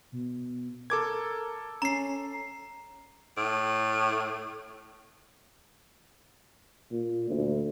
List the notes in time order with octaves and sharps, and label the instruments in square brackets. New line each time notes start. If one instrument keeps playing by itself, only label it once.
[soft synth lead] B2
[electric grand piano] A4 D6 G#6 [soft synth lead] A#4
[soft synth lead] C#4 [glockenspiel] A#5 C7
[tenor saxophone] A2
[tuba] A#2
D2